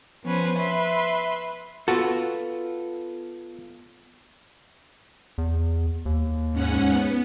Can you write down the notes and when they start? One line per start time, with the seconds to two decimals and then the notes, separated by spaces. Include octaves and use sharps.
0.24 F3 B3 C#4 B4 C5
0.57 B4 E5 C6
1.88 B3 F4 F#4 A4
5.38 E2
6.05 D#2
6.52 G#2 C#4 F#5
6.90 B3